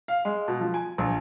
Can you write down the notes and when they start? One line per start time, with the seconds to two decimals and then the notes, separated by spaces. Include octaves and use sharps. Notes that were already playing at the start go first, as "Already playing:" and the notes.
0.08 F5
0.25 G#3
0.48 B2
0.60 F3
0.74 G#5
0.98 A#1